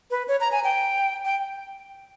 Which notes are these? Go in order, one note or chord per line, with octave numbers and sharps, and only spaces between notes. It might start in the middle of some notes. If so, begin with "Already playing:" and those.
B4
C#5
A#5
G#5
G5
G5